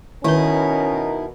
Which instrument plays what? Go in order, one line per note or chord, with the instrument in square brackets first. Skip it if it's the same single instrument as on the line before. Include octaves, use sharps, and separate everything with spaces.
[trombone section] B2 A#4 [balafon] D#3 B4 [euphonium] C#4 [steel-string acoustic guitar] D#4 E4